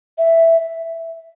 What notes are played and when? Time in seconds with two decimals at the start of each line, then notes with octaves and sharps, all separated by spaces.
0.18 E5